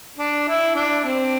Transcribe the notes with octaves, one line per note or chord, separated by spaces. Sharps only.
D4
E4
D4
C4